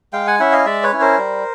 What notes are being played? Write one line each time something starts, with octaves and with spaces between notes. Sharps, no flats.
G#3 F5 G5
F#5 G#5
C#4 E4 E5 F#5
D#5 F5
G#3 D5 E5
B4 C#5
C#4 E4
A#4 C5
G3